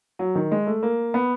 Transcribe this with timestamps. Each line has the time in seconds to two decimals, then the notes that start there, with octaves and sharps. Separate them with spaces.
0.19 F#3
0.35 D#3
0.51 G#3
0.67 A3
0.83 A#3
1.14 B3